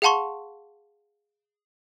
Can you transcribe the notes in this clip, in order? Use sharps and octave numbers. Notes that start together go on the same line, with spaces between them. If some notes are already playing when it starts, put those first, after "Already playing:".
G#4 F5 F#5 A5 C6 C#6